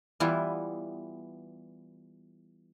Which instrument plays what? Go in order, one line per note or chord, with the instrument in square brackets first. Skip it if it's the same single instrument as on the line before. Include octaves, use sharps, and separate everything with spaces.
[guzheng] E3 G3 B3 E4 F4